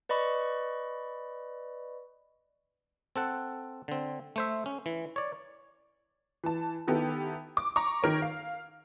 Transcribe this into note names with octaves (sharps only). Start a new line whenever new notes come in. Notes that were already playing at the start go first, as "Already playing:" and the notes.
B4 D5 D#5 B5 C#6
C4 A4 F#5
D3 C4
A3 C5 E5
C#4
E3
C#5 D5
E3 A5
D#3 B3 E4 G4 A4
D6
A#5 C#6 D6
D#3 A#4 C#5
F5